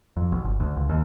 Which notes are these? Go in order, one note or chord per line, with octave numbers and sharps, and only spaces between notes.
F2
B1
G1
D2
C#2
D#2